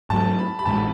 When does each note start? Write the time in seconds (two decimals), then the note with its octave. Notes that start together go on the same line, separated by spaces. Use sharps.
0.10 G#2 F#3 A3 A5
0.39 B5
0.59 B5
0.66 A1 A2 G#3 A5